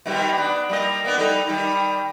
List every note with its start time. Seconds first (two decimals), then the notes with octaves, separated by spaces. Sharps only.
0.06 B2 D#3 G3
0.38 B3 D4
0.69 G3 A#3 D#5
1.04 A#3 B3 D4
1.18 G3 D#4 A4
1.47 D#3 G3